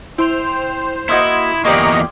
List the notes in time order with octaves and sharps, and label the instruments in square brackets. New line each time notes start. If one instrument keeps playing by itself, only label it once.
[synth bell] E4 C6 F7 [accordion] C5 [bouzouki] G5
[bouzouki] A#3 D#4 F#4 [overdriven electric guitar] E4 [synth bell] C6 D#6 G#6
[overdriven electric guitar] E2 A#3 [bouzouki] F4 G4 D5 [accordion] D#5 A#5 C#6